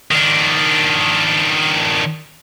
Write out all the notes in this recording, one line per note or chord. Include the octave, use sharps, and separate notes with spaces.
D#3 D4